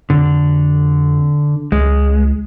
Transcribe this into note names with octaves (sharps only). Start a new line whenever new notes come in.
F2 D3
C#2 G#3